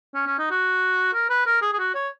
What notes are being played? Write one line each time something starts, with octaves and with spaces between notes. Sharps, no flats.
C#4
C#4
D#4
F#4
A#4
B4
A#4
G#4
G#4
F#4
C#5